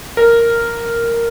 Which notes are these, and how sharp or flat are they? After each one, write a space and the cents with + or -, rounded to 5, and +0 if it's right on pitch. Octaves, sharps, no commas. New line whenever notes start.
A#4 -5